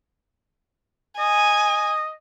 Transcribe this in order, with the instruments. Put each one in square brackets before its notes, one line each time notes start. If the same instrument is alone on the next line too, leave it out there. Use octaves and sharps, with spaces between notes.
[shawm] D#5 [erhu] G#5